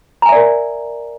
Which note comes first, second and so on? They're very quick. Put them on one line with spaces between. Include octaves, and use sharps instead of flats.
A#5 G#5 E5 D5 A#4